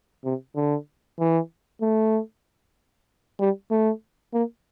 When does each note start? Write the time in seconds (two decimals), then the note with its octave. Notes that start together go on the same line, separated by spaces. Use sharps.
0.25 C3
0.56 D3
1.19 E3
1.82 A3
3.40 G3
3.71 A3
4.34 A#3